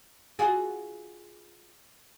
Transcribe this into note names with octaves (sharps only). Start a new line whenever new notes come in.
F4 F#4 G#4